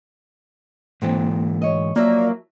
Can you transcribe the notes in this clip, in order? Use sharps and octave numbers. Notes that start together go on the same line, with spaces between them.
G#2 E3 A#3 C4
C#5 D#5
F3 F#3 A#3 D5 E5